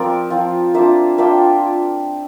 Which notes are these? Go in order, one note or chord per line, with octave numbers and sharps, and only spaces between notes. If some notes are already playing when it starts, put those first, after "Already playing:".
Already playing: F3 C4 F4 A#4 D5
F3 C4 F4
A#3 D4 F4 C5 E5
A#3 D4 F4 E5 G5